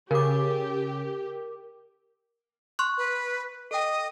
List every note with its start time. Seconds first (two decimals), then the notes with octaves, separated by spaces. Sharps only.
0.11 C#3 G4 A#4 D6
2.79 C6 C#6 F#6
2.97 B4
3.71 A4 D#5 G5